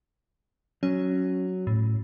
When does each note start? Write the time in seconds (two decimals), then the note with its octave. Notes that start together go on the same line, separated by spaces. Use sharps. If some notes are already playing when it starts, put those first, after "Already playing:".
0.83 F#3 C#4
1.67 A2